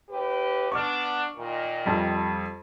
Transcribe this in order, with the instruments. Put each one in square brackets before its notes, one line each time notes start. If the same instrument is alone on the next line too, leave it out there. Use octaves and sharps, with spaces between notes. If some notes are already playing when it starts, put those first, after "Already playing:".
[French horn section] D#2 G4 B4
[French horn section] B3 D4 [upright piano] C#6 D6 F6
[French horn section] A#2 D#3
[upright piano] F2 G3